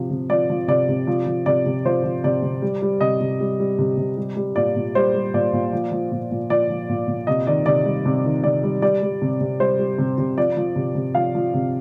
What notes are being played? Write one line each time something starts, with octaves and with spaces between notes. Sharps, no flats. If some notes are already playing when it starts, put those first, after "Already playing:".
Already playing: C3 F3
C3
F3 D5
F3
C3 D5
C3
F3
F3
C3 D5
C3
F3 C5
F3
C3 D5
C3
G3
G3
C3 D#5
C3
G3
G3
C3
C3
G3
G3
A#2 D5
A#2
G3 C5
G3
A#2 D5
A#2
F3
F3
A#2
A#2
F3 D5
F3
A#2
A#2
C3 D#5
D#3 D5
C3 D5
G3
C3
D#3
C3 D5
G3
G3 D5
G3
C3
C3
G3 C5
G3
C3
C3
F3 D5
F3
C3
C3
F3 F5
F3
C3